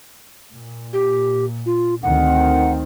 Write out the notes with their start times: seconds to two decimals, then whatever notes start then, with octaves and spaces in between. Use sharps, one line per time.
0.52 A#2
0.93 G4
1.66 F4
2.03 D2 D#3 C4 F#5